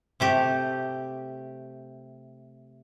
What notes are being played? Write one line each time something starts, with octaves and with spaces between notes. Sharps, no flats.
C3 A3 G4